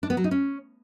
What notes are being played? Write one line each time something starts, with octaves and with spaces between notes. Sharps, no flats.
D4
B3
F#3
D#4
C#4